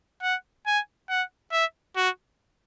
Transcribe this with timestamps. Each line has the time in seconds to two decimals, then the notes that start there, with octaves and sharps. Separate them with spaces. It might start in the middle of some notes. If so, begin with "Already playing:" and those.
0.22 F#5
0.67 G#5
1.10 F#5
1.52 E5
1.96 F#4